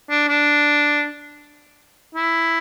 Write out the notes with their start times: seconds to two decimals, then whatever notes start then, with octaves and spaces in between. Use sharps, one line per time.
0.10 D4
0.28 D4
2.15 E4